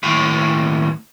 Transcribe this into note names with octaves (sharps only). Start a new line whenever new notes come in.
D#2 A2